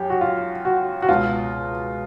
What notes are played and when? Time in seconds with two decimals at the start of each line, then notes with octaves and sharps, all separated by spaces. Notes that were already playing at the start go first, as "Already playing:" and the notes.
Already playing: F#2 G4
0.10 F#4
0.21 F4
0.65 F#4
1.02 F#4
1.09 C#2 B2 F4